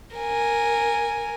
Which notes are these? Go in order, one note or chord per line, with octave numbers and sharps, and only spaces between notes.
A#4 G#5